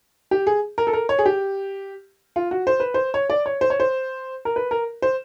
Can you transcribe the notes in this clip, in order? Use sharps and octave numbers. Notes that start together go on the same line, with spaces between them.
G4
G#4
A#4
A4
A#4
C#5
G#4
G4
F4
F#4
C5
B4
C5
C#5
D5
C#5
C5
C#5
C5
A#4
B4
A#4
C5